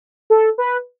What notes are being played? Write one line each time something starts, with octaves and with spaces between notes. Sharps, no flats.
A4
B4